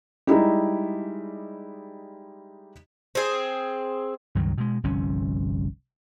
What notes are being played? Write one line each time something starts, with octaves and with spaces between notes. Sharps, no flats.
G3 G#3 D#4 E4 G4
C4 G#4
C#2 G2 D#3 F#3
B2 G#3
G1 C2 F3 C#4